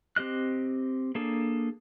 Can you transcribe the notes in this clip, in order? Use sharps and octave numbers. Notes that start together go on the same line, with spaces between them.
C4 G4 D#5 F#6
A#3 D4 G#4 A4